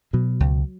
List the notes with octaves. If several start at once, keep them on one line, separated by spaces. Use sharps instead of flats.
B2 F#3
C#2